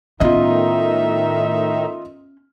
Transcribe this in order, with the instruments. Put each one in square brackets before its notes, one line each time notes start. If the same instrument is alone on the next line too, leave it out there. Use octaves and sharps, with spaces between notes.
[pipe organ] A2 D#3 D#4 [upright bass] B3 C#4 [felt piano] F4 D#5 [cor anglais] E5